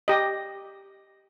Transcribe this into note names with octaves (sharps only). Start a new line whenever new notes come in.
G4 D#5